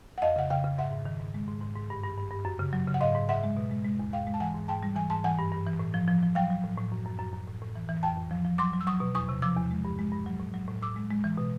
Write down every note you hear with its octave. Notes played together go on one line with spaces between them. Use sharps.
F#5
F2 D#5 F5
C#3 F#5
C#3 F5 G5
C#3
G#2 E5 F#5
G#2
D#3
G#2
G#3
G#2
G#2
G#2
G2
G2
G2
G2
F#2
C#3
F#3
C#3
F#5
G#2 D#5 F5
G#2
G#2 E5 F#5
G#3
B2
G#3
G#3
E2
G#2 F5 G5
G#3
A5
E3 F#5 G#5
G#2
G#2 G5 A5
G3
E3 G#5
G#2 A5
E3 F#5 G#5
G2
G2
E3
A2
F3
F3
F3
F#3 F5 G5
F#3
A2
A2
F#2
F#2
F#2
F#2
A2
A2
E3
E3
F2 G5 A5
F2
F3
F3
F#3 C6 D6
F#3
E6
F#3 C#6 D#6
B2
E2 C#6 D#6
C3
F3 D6 E6
E2
G#3
G2
G#3
G2
F#3
A2
F#3
A2
A2 D6 E6
G#3
G#3
E3
B2